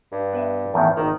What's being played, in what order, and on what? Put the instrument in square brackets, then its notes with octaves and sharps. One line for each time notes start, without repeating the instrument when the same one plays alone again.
[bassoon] G2
[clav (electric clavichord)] B3 B4 E5
E2 A2 D#3
[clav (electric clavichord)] G#1 A#3 A#5 [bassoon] D#3